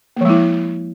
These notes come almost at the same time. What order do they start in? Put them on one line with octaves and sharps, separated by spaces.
A#3 F3 G#3 E4